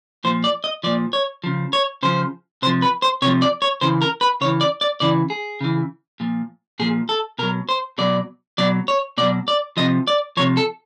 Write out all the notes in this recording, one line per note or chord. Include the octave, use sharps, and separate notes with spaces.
A#2 F3 C5
D5
D#5
A#2 F3 D5
C#5
C#3 F3
C#5
C#3 F3 C5
C3 F3 C5
B4
C5
C3 F3 C#5
D5
C#5
C#3 E3 C5
A#4
B4
C#3 E3 C#5
D5
D5
C#3 E3 D5
G#4
C#3 E3
A#2 F3
A#2 F3 G#4
A4
B2 F#3 A#4
C5
B2 F#3 D5
B2 F#3 D5
C#5
B2 F#3 D5
D5
C3 F3 D#5
D5
C3 F3 C#5
A4